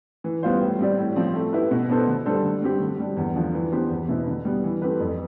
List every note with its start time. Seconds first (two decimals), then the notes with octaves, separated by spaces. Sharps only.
0.24 E3
0.43 G3 B3 F4 C5
0.61 A2
0.79 G3 C4 G4 D5
0.98 A2
1.16 F3 C4
1.34 A3
1.53 E4 G4 B4
1.71 B2
1.89 B3 D4 A4 C5
2.07 D3
2.26 G3 D4 A4 C5
2.44 D3
2.62 G3 C4 G4
2.80 D3
2.99 G3 D4
3.17 E2
3.36 D3 F3
3.54 E3
3.72 B3 D4 G4 C5
3.90 E2
4.09 B2 B3 E4
4.27 D3
4.45 G3 B3
4.64 E3
4.82 A3 C4 G4 B4
5.00 F2